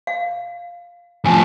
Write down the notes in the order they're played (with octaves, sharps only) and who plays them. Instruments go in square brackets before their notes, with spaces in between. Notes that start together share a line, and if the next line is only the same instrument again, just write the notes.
[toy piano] F5
[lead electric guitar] A2 F3 [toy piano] G#5 A5